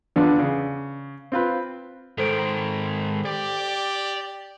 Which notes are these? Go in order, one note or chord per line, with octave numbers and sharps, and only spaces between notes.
E2 D3 B3 D4 F4
C#3
C4 F4 B4
G#2 D#3 A4 C5 D7
G4 D5